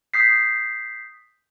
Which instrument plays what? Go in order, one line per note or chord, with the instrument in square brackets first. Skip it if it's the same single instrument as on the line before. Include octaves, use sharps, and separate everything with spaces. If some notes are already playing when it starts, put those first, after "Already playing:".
[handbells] D#6 G6 B6 C7